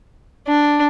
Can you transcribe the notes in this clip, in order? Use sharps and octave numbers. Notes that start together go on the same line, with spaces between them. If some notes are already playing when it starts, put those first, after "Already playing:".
D4